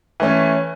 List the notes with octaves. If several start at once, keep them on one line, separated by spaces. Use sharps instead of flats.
E3 A3 C#4